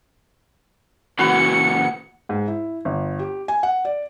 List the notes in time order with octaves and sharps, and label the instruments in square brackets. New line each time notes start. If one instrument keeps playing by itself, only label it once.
[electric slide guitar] A#2 C#3 E3 [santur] F#4 B4 [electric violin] C#7
[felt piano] G#2
E4
G1
G4
G#5
F#5
D5